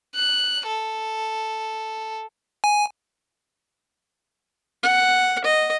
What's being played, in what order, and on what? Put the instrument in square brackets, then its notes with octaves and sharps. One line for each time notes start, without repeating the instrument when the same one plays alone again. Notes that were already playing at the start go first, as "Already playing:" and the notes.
[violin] F#6
A4
[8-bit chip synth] G#5
[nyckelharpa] F#5
D#5